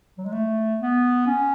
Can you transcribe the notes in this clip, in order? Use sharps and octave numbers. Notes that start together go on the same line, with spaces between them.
F#3
G#3
A3
B3
C#4